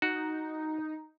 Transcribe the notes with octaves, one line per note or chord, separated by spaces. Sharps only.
D#4 F#4